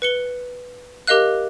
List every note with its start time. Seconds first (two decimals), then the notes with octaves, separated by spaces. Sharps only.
0.02 B4 C#7 G7
1.07 G4 A#4 D#5 F5 F#6